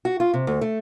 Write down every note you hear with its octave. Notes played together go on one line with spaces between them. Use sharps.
F#4
F4
C3
D2
A3